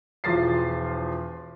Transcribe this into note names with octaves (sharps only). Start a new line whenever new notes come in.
E1 F3 A6 C7